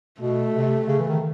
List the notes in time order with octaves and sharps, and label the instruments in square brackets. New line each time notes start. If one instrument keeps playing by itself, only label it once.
[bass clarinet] B2 [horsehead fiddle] A3
[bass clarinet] C3
C#3
E3
D#3